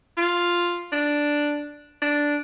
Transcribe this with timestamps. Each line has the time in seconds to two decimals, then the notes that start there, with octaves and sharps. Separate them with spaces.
0.17 F4
0.92 D4
2.02 D4